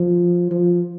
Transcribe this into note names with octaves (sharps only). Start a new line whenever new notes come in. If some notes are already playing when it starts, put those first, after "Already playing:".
Already playing: F3
F3